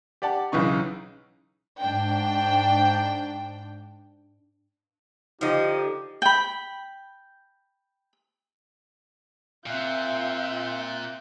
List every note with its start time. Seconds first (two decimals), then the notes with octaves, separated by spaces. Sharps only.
0.22 G4 D5 F#5 A5
0.52 B1 C#3 E3 D#4 C#6
1.80 G#2 D4 G5
5.41 D3 F3 D#4 G4 D#5
6.22 G5 B5
9.66 A#2 C4 F4 E5 F#6 G6